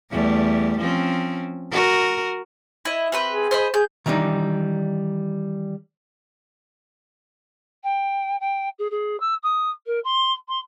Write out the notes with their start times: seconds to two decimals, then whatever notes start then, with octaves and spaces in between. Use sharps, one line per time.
0.11 E2 G3 A3
0.80 F3 C4 C#4
1.71 F#4 A#4
2.85 E4 D#5
3.12 C4 G4 B4
3.31 G#4
3.51 C5 D#5 B5
3.74 G#4 G6
4.06 D#3 E3 G3 D4 D#4
7.83 G5
8.40 G5
8.78 G#4
8.90 G#4
9.20 E6
9.43 D#6
9.86 A#4
10.04 C6
10.48 C6